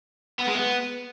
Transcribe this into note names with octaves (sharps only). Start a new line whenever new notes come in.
B3
G#3
B3